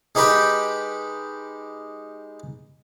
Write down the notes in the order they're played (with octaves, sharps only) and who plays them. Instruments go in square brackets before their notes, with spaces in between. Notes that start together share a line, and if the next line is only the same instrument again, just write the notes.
[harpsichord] G#3 D#4 G4 B4 G5